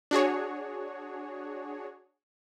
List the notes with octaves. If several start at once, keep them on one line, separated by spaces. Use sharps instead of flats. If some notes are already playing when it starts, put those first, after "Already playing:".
D4 F#4 G#4 C#5